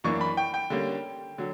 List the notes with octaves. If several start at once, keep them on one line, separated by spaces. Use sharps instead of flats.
F#2 E3 A#3 D4 C#6
B5
G5
G5
D3 G3 A#3 C#4
D3 F#3